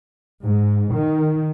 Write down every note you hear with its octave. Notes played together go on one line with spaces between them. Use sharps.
G#2
D#3